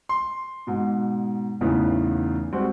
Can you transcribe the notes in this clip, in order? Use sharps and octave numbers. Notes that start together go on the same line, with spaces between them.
C6
G#2 B2
E2 A2 C#3 E3 B3 D#4
G3 G#3 C4 F#4